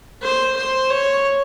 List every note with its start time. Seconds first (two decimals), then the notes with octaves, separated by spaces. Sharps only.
0.22 C5
0.57 C5
0.90 C#5